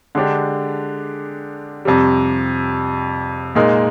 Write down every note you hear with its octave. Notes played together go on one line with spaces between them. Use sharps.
D3 G#3 D4 G4
F2 C3 G3
A#2 G#3 D#4 A#4